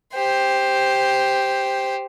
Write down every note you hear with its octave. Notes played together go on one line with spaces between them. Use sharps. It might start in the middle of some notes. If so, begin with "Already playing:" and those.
G4 C5